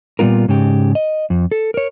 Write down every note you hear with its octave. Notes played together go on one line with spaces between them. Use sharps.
A#2 G3 B3 F4 A#4
G#2 C#3 G4
D#5
F2
A4
A#4 C#5